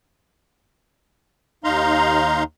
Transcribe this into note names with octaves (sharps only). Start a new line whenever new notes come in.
D#2 D#4 F5 A#5 C6